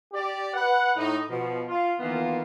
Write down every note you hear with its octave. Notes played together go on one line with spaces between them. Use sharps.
G4 D5
B4 F#5
A2 D#4
B2 F3
F4
D#3 E3 A#3 B3 F4